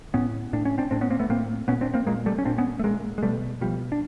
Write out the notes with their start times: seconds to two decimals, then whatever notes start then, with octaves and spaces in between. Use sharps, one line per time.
0.14 A2 B3 C#4
0.53 A2 D4
0.65 C#4
0.78 C4 D4
0.91 A2 C4 D4
1.01 B3 C#4
1.10 A#3 C4
1.19 A3 B3
1.29 A2 A#3 C4
1.68 A#2 B3 C#4
1.81 C4 D4
1.94 A#3 C4
2.07 A#2 G#3 A#3
2.26 G3 A3
2.38 C#4
2.45 A#2 C4 D4
2.58 B3 C#4
2.79 A3
2.84 A#2 G#3 A#3
3.18 G#3
3.22 B2 G3 A3
3.61 B2 F3 G3
3.92 D4